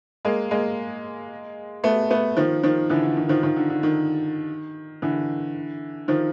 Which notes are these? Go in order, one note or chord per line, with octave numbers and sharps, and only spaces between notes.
G#3 A#3
G#3 A#3
A3 B3
A3 B3
D#3 F3
D#3 F3
D3 E3
D3
D#3
D#3 F3
D#3 F3
D3
D3
D#3
D3 E3
D#3 F3